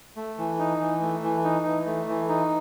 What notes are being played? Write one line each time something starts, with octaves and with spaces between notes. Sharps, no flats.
A3
E3
D#4
E3
A3
E3
D#4
E3
A3
E3
D#4